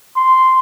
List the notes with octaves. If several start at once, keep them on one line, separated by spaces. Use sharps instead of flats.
C6